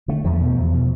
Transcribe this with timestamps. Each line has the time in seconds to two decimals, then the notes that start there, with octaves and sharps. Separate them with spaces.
0.08 D3 A3
0.24 E2 F3
0.41 B2
0.57 E2
0.72 B2